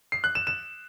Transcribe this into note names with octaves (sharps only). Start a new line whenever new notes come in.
C7
F#6
E7
E7